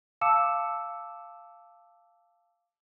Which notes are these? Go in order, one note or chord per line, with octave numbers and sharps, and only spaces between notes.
F5 A5 D6 E6 C#7 E7